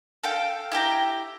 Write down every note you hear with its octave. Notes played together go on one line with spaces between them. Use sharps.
A4 F5 G5
E4 G4 G5 A#5